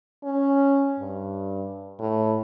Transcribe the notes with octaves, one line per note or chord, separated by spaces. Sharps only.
C#4
G2
A2